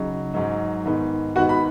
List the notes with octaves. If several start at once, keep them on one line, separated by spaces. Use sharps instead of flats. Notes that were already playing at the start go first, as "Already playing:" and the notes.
Already playing: C#3 F#3 D#4
G#2 F#3 D#4
G#2 D#3 B3 D#4
G#2 D#3 B3 D#4 F#4 F#5
B5